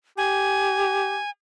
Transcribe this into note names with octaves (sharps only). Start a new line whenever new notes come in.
G4 G#5